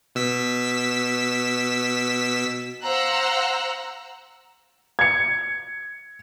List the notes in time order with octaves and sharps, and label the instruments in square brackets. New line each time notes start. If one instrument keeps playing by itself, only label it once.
[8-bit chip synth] B2 E6 B6
[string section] C5 F5 F#5 A#5 E6 F#6
[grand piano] G#6 C#7